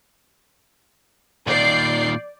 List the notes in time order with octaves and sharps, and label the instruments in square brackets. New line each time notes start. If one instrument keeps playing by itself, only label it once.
[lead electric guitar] A#2 D#3 [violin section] D5 G6 C7